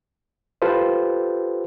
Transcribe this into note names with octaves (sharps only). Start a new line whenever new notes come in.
F4 G4 A4 B4 C5